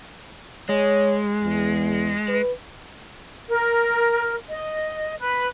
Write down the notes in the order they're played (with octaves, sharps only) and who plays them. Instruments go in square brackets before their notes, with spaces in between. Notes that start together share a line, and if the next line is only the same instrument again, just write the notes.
[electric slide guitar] G#3 [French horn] C#5
[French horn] E2
B4
[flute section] A#4
D#5
B4